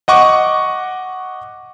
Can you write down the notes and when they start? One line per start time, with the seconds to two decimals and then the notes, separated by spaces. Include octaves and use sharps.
0.08 D#5 F#5 C#6 D6